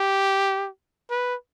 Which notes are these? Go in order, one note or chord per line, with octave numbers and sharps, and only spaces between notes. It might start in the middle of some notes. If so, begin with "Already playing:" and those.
Already playing: G4
B4